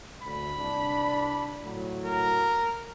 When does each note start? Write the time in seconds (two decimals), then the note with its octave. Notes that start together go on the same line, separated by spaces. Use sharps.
0.24 D2 B5
0.57 C2 D4
1.64 D2 A2 F#3
2.04 A#4